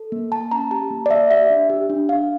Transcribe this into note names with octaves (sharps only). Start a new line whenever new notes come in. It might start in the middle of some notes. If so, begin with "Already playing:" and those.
Already playing: A4
A#3
A#3 A5
C#4 A#5
G4 A5
A#3
D5
A#3 E5
G4 E5
D4
G4
D4
D4 F5